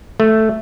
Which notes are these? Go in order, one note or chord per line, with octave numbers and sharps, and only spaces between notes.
A3